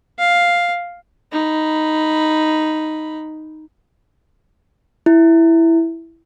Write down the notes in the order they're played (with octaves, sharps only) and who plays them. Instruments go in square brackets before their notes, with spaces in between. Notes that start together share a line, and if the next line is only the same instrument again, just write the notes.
[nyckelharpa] F5
D#4 B5
[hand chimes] E4